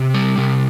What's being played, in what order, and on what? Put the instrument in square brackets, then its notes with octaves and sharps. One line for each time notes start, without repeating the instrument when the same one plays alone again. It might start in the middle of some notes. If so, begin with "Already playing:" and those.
Already playing: [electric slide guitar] C3
G3
C3